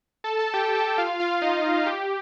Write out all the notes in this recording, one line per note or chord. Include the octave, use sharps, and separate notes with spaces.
A4 A5
A4 A5
G4 G5
G4 G5
F4 F5
F4 F5
D#4 D#5
F4
G4